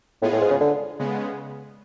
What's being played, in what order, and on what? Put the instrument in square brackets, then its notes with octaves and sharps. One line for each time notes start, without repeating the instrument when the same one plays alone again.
[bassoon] A2 [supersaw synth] G#3 B3 F4 G#4
[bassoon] A2
G#2
C#3
D3
[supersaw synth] C#3 G#3 B3